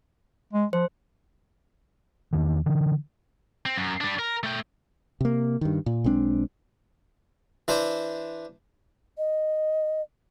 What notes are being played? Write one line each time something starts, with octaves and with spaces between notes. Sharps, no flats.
G#3
F3 C5
E2 D#3
D3 E3
C4
F#2
G3 D4
A#4
A3 G5
C3 A#3
G2 D#3
A#2
B1 G#3 C4 D4
E3 D4 C5
D#5